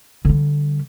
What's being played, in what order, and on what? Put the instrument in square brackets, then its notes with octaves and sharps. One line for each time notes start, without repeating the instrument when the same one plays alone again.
[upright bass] D3 G3